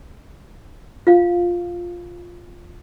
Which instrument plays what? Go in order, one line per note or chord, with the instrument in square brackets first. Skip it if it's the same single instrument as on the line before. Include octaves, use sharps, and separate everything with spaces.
[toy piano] F4 F5